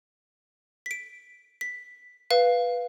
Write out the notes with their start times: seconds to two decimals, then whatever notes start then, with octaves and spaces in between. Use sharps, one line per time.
0.86 B6
0.91 D7
1.61 B6
2.31 B4 F5